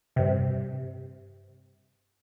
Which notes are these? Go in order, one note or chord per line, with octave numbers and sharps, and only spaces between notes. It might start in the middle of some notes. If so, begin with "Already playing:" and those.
G2 C3